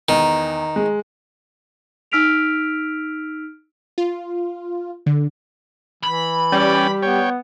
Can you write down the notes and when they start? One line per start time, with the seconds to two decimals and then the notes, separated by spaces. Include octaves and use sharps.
0.09 E2 D#3 A#5
0.76 G#3
2.12 D#4 E6 F6 B6 D7 F7
3.98 F4
5.06 D3
6.03 E3 B5
6.52 G3 C#4 D5 G5
7.03 B3 C#5 G5